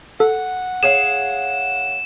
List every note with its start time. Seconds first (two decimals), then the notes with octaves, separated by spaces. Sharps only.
0.20 A4 F#5
0.83 G#4 C#5 F5 E7